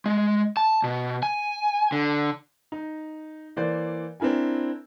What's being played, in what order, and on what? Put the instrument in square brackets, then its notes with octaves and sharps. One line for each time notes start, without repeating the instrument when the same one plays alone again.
[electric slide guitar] G#3
A5
B2
G#5
D3
[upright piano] D#4
E3 A#3 C5 D5
C4 D4 E4 A#4 G#5